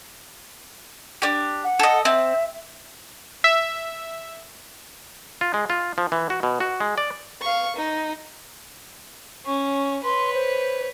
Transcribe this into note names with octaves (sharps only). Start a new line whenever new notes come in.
D4 G4
F#5
A4 D#5
C4 E5
E5
F4
G#3
F4
F3
E3
F#4
B2
F#4
G#3
D5
F5 C#6
D#4
C#4 C#6
B4 C#5 C6
C5